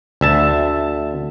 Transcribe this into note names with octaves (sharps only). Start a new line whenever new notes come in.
D2 E5 A5